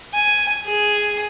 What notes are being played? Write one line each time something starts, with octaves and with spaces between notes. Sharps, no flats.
G#5
G#4